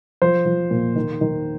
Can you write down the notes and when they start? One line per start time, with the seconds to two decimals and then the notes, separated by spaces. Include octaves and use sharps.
0.22 F3 C5
0.46 F3
0.71 A#2
0.96 D#3
1.21 D#3